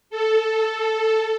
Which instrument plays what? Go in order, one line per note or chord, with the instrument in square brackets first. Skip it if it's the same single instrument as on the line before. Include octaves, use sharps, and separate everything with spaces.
[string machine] A4